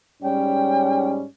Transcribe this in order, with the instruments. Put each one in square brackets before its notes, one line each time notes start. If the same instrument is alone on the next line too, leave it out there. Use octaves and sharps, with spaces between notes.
[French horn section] G#2 G3 C#4 [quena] G5